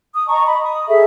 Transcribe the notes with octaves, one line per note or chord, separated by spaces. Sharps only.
D#6
D#5 A5 A#5 C#6
D#5 B5
D#6
G#4 A4 E5